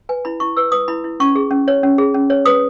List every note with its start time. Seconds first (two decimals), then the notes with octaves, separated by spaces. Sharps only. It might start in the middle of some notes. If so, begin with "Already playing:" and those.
0.09 B4 G#5
0.25 E4 B5
0.40 E4 C#6
0.57 B4 E6
0.72 B4 D#6
0.88 E4 B5
1.04 E4
1.20 C#4 C#6
1.35 G#4
1.51 C#4
1.68 C#5
1.83 C#4
1.98 G#4
2.14 C#4
2.30 C#5
2.45 B4 D#6